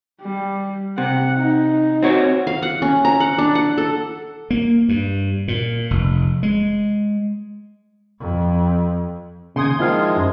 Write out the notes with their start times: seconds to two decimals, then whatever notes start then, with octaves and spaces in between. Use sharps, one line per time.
0.21 G3
0.98 C3 F#5
1.37 D#4
2.03 C4 F#4 C#5
2.47 F5
2.62 F#5
2.82 C#4
3.05 A#5
3.20 F#5
3.38 D4
3.55 F#5
3.78 A4
4.50 A#3
4.89 G2
5.48 A#2
5.91 F1
6.43 G#3
8.20 F2
9.56 D#2 C#3 C6 D#6 G#6
9.79 D#3 F3 G#3 E4 F4 F5
10.16 F#2